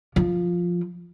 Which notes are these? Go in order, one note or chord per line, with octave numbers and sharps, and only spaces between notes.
F3